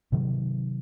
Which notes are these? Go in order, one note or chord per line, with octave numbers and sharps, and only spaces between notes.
C3 D#3 F#3